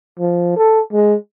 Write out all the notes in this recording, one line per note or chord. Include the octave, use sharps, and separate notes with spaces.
F3
A4
G#3